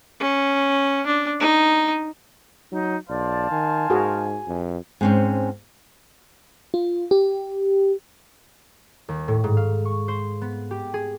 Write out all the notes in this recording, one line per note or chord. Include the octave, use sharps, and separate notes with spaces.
C#4
D4
D#4
F#3 D#4
B1 C5 D5 F5 A5
D#3 G#5
G#2 F#4 G#4 A#4
F2
G#2 C4 C#4
F4
G4
D#2
A2
G#2
F5
C#6
C5
B3
G4
G#4